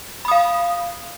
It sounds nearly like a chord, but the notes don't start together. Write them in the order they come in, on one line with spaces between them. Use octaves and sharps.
B5 D#6 F5